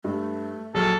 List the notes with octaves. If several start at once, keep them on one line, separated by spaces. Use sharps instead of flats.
G2 A3
A#1 F#3 G#4 A4 F6